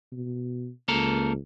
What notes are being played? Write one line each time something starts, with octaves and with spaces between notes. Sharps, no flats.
B2
C#2 A#3 A4 A#4